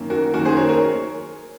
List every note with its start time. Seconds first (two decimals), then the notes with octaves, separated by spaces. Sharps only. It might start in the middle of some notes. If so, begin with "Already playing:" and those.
Already playing: F#2 D#3 A#3
0.10 F#4 A#4
0.34 F#2 D#3 A#3 F#4 A#4
0.45 G#4 C5
0.57 A#4 C#5
0.69 A#4 C#5